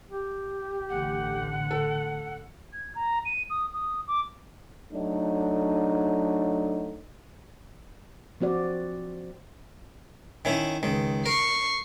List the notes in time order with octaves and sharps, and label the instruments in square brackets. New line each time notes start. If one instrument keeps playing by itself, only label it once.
[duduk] G4
[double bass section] A1 D3 [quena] F#5
[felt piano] A4
[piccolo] G#6
A#5
D#7
D#6
D#6
D6
[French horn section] F#3 A3 D4 D#4
[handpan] F3 C4 F#4 D5
[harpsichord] D#3 C#4 E4
C#2 D#3
[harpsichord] A#4 [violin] C#6 C7